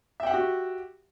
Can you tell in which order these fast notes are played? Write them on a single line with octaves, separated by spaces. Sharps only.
E5 G5 F#5 G4 F#4